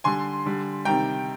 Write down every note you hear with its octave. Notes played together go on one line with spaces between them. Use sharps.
D3 G3 G#5 C6
D3 G3
C3 D#3 G3 G5 A#5